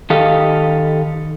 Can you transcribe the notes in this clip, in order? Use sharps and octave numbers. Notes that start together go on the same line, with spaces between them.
D#3 G4 A4 D#5 F5